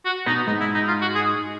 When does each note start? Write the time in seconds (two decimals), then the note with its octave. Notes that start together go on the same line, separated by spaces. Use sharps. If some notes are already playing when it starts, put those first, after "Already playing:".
0.05 F#4
0.26 B2 B3 D#4
0.47 G#2 G#3 D#4
0.60 E4
0.74 D#4
0.88 F4
1.01 F#4
1.15 G#4